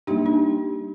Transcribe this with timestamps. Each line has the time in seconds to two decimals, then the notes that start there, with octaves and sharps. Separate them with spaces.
0.07 G3 A#3 D4 D#4 G4
0.26 D4